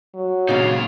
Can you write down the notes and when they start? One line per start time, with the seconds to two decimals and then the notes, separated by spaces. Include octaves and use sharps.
0.14 F#3
0.49 A#2 C#3 D#4 F5